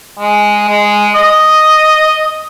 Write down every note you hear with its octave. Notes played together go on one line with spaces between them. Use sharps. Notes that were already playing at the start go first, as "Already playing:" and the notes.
G#3
G#3
D#5